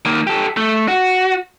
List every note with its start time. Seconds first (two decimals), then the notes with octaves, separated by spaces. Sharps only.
0.05 D#3 A#3
0.27 G4 A4
0.57 A3
0.88 F#4